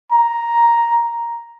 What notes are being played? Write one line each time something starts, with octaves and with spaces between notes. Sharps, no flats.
A#5